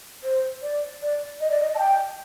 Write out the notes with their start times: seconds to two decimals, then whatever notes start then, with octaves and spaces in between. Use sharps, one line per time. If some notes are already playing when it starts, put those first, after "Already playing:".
0.24 C5
0.62 D5
1.02 D5
1.41 D#5
1.51 D5
1.60 D#5
1.75 A5
1.79 G5